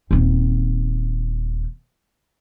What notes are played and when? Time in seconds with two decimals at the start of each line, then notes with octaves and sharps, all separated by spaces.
0.11 D#1 C4